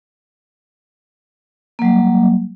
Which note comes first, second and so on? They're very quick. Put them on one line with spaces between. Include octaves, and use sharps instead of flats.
A#3 F#3 G3